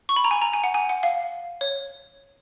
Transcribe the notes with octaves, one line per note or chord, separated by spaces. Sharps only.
C#6
B5
A#5
G#5
A#5
G#5
F#5
G#5
F#5
F5
C#5